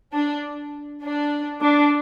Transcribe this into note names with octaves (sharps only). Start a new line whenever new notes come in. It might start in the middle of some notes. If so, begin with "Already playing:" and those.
D4
D4
D4